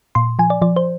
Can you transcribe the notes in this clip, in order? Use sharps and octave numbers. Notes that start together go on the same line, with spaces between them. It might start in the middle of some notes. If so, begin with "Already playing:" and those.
A#2 C6
F3 G#5
D5
F3 D5
C5